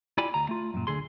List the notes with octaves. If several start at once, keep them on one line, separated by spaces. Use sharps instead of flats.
E4 F4 G4 D5 G#5 B5
D2 A#5
A3 F4
F#2 A#2
D2 D3 G#4 C6